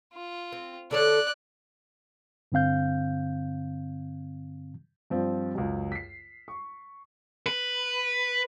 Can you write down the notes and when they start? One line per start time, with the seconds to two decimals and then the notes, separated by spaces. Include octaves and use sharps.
0.13 F4
0.52 C4
0.91 D3 A4 C#5 D5 F#6
2.52 G2 D3 C4 F5 G6
5.10 G2 F3 C4
5.55 C#2 F#2
5.92 B6 C7
6.48 C#6
7.46 B4